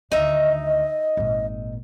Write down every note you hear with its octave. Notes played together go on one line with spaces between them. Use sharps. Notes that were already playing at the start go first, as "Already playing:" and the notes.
D2 D#3 D#4 D#5 E5
G#1 A#2